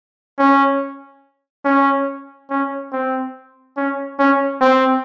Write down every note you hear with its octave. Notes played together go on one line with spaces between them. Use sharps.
C#4
C#4
C#4
C4
C#4
C#4
C4